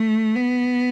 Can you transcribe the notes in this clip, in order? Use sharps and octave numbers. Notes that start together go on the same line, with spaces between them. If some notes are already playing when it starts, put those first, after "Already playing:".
Already playing: A3
B3